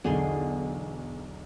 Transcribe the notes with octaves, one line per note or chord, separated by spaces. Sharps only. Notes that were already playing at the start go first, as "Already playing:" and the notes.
B1 E2 D3 G#4 C6